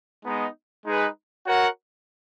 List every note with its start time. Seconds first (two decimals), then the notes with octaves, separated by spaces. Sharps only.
0.25 G#3 B3 D#4
0.85 G#3 D#4 G#4 B4
1.46 F#4 A#4 C#5 F#5